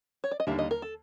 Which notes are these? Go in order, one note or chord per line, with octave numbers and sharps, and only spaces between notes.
C#5
D5
D#5
D#2 D3 G3 A#3 E5
D#5
A#4
A4